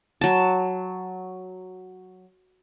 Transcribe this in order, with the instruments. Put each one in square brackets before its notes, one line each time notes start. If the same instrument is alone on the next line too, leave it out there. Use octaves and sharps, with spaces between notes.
[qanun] F#3 A5